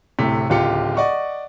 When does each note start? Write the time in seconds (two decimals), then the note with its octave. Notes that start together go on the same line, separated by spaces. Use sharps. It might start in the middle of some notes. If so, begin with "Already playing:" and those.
0.19 D1 A2 C3 B6
0.50 D1 C#2 F4 G4 C#7
0.97 D5 D#5 F#5 C#6